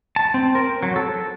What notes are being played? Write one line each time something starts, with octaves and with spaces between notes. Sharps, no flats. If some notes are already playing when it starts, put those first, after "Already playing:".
A5
C4
A#4
F#3
A4